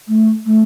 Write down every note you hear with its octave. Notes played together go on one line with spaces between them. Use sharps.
A3
A3